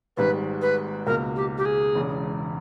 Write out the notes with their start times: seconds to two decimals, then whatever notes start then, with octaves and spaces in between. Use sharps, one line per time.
0.17 G#1 G#2 G3 B4
0.61 B4
1.06 C#2 B2 A#3 A#4
1.36 G4
1.57 G4
1.65 G#4
1.95 E1 E2 C#3 G#3